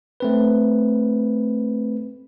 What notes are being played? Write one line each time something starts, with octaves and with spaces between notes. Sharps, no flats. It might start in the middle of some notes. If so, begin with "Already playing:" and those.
A3 C4 B4